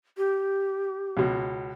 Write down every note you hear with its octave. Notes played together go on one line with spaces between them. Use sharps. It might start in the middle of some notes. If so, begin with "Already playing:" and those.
G4
C#2 B2